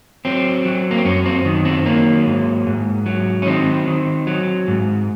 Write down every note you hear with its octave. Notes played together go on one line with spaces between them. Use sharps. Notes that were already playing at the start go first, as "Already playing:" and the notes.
F#3 C4
F#3
A#3
C4
F#2 C#4
C4
D#3
C4
F#3 A#3
G#2
G#2
F#3
C#4
D#3 C4
D#3
F#3
G#2